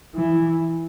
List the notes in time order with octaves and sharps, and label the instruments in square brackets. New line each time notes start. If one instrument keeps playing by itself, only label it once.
[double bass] E3